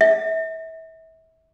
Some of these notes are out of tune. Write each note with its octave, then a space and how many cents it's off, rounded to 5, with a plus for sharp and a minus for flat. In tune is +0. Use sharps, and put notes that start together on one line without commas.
E5 -30